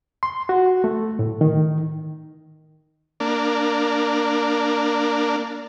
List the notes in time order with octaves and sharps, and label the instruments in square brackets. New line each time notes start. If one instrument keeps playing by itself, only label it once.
[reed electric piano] C6
F#4
A3
A2
D#3
[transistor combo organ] A#3 D4